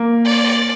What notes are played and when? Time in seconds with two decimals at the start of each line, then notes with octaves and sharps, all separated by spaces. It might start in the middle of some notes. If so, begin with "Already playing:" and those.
Already playing: A#3
0.25 D5